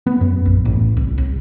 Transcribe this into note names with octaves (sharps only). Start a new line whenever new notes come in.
B3
F#2
A#1
A1
C2
C2